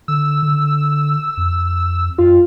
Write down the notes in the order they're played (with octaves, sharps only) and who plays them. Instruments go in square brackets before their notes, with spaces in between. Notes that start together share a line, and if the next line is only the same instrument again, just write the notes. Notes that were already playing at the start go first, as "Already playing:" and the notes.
[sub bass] D3 [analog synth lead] E6
[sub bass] D3
F2
[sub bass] F#2 [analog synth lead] F4